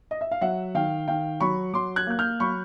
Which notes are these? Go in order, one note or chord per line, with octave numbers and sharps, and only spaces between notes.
D#5
E5
F5
F#3 E5 F#5
D#3 F5 G5
D#3 F5 G5
F#3 B5 C#6
F#3 C6 D6
F#6 G#6
A#3 F#6
F6 G6
F#3 B5 C#6